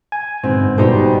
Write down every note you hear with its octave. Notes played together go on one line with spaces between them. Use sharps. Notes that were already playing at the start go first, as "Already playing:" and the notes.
G#5
G1 G#2 B2 C4
B2 G3 B3 D#4 G4 C5